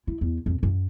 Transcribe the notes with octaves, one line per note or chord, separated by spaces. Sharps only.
E4
E2
F2
F#2